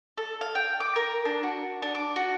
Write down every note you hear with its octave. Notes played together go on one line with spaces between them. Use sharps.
A4
F5
G5
D6
A#4
D4
F#4
D4
D6
F#4